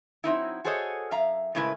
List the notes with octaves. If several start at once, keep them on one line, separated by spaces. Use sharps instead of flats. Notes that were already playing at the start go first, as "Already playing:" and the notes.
F#3 C4 D#4 E4
F#4 G#4 A4 C5 C#5 D#5
F#2 E5 F5 A#5
A2 C#3 G#3 E4 A#4 B4